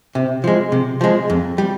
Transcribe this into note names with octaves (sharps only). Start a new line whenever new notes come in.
C3
F3 G#3
C3
F3 G#3
F2
G3